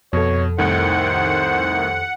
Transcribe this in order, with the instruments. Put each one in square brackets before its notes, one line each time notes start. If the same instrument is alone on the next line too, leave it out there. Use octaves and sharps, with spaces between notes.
[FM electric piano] F2 A4 [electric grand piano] B2 [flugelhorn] C#5
[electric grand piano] C2 A2 D#3 [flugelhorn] C5 [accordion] F#5